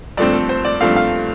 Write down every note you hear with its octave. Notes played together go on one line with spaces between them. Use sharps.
G2 F3 A3 C4 D5
A4
C5
D5
G2 F3 A3 C4 F5
F5